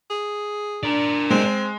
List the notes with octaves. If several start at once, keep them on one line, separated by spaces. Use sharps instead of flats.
G#4
D4 A#4 D5
G#3 C4